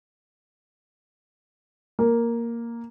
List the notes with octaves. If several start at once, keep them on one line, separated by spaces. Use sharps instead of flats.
A#3